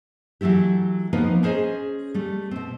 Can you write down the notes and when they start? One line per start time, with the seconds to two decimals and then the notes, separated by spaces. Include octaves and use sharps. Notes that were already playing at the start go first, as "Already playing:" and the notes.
0.41 E3 F#3 A3 E4 G4
1.13 F3 A#3 B3 D#4 B4
1.43 C#4 G#4 C5 D#5 G#5
2.14 G3 A3
2.51 B2 C4